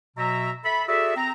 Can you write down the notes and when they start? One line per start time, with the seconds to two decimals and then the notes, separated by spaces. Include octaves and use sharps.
0.17 B2 F#3 E5 A#5
0.65 A4 E5 B5
0.88 F#4 G#4 A4 D5 E5
1.16 C4 A#5